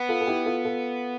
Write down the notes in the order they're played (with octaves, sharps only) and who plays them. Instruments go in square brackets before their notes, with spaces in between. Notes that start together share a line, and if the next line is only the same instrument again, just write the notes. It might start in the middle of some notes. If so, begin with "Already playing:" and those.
Already playing: [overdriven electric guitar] B3
[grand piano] F4 A4
A4
E4 G4
F4 A4
F4 A4